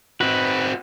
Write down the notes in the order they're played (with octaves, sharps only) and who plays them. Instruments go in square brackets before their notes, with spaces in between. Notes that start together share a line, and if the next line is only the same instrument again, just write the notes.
[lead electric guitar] C4 F#4 [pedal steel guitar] B4